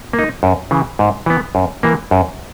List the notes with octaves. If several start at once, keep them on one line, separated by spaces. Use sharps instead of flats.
A#3
D#4
F#2
C#3 E3
G#2
E3 B3
F#2
E3 A#3
F#2